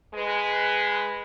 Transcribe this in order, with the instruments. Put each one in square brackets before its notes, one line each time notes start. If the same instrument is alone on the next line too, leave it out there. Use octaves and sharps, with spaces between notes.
[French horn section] G#3 B4